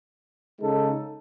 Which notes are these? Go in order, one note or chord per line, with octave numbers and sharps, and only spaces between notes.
C#3 G#3 D#4 A4